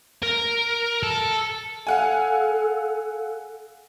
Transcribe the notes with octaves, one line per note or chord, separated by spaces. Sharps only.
A#4
A4
A4 F5 F#5 G#5